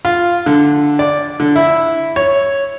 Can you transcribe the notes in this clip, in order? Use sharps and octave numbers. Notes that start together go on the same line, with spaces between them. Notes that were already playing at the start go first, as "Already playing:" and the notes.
F4
D3
D5
D3
E4
C#5